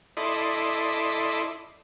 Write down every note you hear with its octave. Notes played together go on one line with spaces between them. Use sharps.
E4 A4 D5 D#5 B5 C6